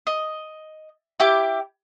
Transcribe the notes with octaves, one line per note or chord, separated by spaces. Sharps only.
D#5
E4 G4 D6